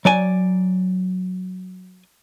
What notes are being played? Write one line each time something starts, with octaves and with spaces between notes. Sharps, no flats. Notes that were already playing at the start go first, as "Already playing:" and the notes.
F#3 D5 G#5